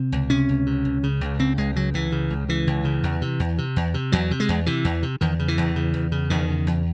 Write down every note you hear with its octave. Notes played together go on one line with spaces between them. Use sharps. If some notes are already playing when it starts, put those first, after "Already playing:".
Already playing: C3
C#2
C3 C#4
C#2
C3
C#2
C#3
C#2
C#3 C4
C#2 G#3
C#3 F#3
C#2 E3
C#3
C#2
C#3 E3
C#2
C#3
E2
C3
E2
C3
E2
C3
E2 F#3
C3
G#3
E2
C3 E3
E2
C3
E2 D#3
C#3
E3
E2
C#3
E2
C#3
E2 D#3
C#3
E2